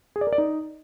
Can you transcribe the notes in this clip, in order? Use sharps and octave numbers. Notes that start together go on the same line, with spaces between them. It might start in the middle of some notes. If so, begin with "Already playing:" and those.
G#4
D5
A#4
D5
D#4